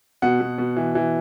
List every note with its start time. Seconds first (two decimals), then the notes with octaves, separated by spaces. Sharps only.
0.22 B2 F#5
0.40 B2
0.58 B2
0.77 E3
0.95 E3